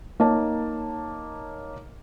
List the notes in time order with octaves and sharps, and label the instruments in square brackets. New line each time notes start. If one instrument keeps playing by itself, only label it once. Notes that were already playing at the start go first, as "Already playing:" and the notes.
[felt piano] A#3 D#4 C#5 A5